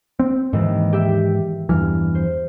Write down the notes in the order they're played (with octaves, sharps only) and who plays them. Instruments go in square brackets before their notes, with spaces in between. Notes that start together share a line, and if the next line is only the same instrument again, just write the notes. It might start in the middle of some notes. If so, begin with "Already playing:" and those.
[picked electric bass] C4
[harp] D#2 E3 [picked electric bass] G#2
[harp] G4 E5
[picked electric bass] E2 G2 E3 [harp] F6
[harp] C5